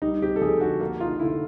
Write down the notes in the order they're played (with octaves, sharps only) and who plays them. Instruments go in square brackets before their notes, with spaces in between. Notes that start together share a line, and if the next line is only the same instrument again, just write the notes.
[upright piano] G3 [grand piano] D#4
[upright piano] C4 [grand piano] G4
[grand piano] A4
[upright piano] F2 [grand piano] G#4
[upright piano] D3 [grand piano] F#4
[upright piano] A#3
[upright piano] D#4 [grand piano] F4
[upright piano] D3 [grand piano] E4